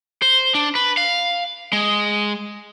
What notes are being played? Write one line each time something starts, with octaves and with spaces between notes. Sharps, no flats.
C5
D4
B4
F5
G#3